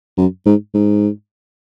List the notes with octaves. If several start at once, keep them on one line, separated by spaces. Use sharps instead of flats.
F#2
G#2
G#2